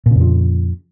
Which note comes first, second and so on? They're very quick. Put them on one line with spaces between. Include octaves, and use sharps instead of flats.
A#2 C#3 F2 F3